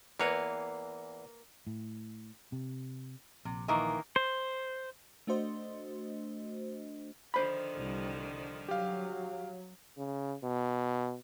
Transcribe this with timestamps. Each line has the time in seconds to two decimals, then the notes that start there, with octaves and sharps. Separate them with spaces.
0.19 E2 E3 A#3 B4 C#5
1.67 A2
2.52 C3
3.45 A#1 C3
3.68 D#3 E3 A#3
4.16 C5
5.27 A3 D4 F#4 C5 D#5
7.34 D3 D#3 F3 C5 B5
7.76 C2
8.69 F#3 G4 F5
9.97 C#3
10.43 B2